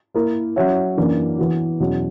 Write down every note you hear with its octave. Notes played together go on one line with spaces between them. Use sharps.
A#3 E4 A#4
F#3 C#4 F#4 C#5 E5
F#2 E3 A#3 D4
E3 B3 F#4
E2 B2 F#3 C#4